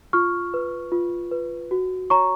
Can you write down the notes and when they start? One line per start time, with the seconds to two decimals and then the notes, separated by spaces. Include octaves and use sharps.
0.13 F4 C#6 F6
0.54 B4
0.92 F4
1.31 B4
1.71 F#4
2.10 C#5 A#5 C#6